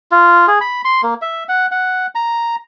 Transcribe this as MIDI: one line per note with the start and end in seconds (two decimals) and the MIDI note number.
0.12 0.47 65
0.47 0.59 68
0.61 0.82 83
0.85 1.01 84
1.03 1.14 58
1.22 1.44 76
1.49 1.66 78
1.71 2.06 78
2.15 2.56 82